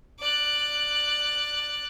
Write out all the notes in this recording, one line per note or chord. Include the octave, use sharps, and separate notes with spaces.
D5 F#6